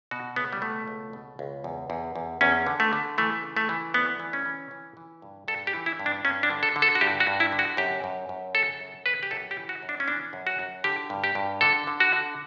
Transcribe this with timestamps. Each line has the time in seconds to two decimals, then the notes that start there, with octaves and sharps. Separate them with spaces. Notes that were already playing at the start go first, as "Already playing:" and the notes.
0.11 B2 F#4
0.36 C#2 B3
0.53 G3
0.62 B2 A3
0.88 C#2
1.13 B2
1.39 C#2
1.64 E2
1.90 E2
2.16 E2
2.41 E2 C#4
2.66 D3
2.80 A3
2.93 D3
3.18 E3 A3
3.44 C#3
3.57 A3
3.69 E3
3.94 D2 B3
4.20 E3
4.33 C#4
4.45 E3
4.71 E3
4.97 E3
5.22 G2
5.48 G2 A4
5.67 G4
5.74 E3
5.86 E4
5.99 G2
6.06 D4
6.25 G2 C#4
6.43 D4
6.50 D3
6.63 A4
6.76 D3
6.82 A4
6.95 F#4
7.01 G2 G4
7.20 F#4
7.27 G2
7.40 E4
7.52 D3
7.59 F#4
7.77 F#2 G4
8.04 F#2
8.29 F#2
8.54 C#3 A4
8.80 F#2
9.06 C#3 B4
9.23 G4
9.31 F#2 A4
9.51 G4
9.57 E3
9.69 F#4
9.83 F#2
9.89 D4
10.00 C#4
10.08 E3 D4
10.33 F#2
10.47 F#4
10.59 F#2
10.84 D3 G4
11.10 G2
11.24 G4
11.35 G2
11.61 D3 A4
11.87 D3
12.00 F#4
12.13 D3